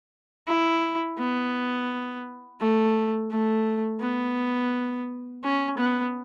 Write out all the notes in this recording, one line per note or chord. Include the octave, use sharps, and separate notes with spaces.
E4
B3
A3
A3
B3
C#4
B3